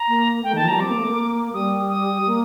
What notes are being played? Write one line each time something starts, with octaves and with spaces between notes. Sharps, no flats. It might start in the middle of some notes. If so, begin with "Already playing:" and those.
Already playing: A#5
A#3
A3 G5
D#3 A5
F3
G3 A#5
C4 D6
A#3
A3
A#3
G3 D#6
D#6
A#3